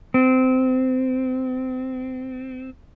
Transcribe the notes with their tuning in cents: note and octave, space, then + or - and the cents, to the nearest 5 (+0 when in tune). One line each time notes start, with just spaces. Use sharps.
C4 -20